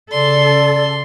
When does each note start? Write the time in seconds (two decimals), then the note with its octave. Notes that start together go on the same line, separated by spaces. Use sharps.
0.11 C#3 A4 D5 C6